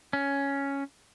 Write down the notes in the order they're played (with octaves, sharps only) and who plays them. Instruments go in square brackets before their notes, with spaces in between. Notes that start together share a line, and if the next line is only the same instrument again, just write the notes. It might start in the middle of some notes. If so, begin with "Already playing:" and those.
[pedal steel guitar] C#4